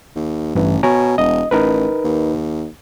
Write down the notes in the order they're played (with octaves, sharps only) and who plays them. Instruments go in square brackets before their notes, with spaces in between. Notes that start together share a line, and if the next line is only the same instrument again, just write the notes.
[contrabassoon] D#2
[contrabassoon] A1 [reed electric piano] G2 E3
[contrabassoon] B2 [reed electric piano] C#5 G#5 A#5
[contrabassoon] E1 [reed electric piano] D#5
[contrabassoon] A1 [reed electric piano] D#4 A#4 B4
[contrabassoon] D#2